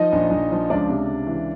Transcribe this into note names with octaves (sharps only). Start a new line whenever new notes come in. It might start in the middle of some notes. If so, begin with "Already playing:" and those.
Already playing: F3 D#4 D#5
A#1
A#1
F3
C#2 D4 D5
C3
C#2
E3